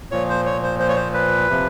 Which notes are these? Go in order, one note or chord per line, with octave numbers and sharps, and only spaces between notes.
A#2 F3 C#5
C5
C#5
C5
C5
C#5
C5
B4
C3 F3